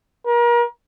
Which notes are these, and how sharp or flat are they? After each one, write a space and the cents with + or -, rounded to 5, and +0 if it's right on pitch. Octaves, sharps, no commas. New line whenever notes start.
A#4 +35